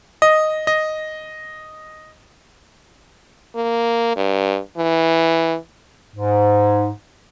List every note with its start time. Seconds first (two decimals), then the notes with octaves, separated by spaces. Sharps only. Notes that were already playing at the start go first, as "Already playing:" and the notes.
0.22 D#5
0.67 D#5
3.55 A#3
4.16 G2
4.77 E3
6.15 G#2